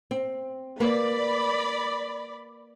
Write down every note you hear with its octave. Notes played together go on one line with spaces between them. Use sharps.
C4
A#3 B4 D5 B5